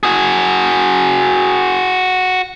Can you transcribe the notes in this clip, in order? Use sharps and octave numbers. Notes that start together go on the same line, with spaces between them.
F#4 G#4